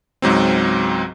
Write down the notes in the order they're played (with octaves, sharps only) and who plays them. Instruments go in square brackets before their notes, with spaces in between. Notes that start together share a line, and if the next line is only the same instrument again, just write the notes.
[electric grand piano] C#2 G#2 F#3 C4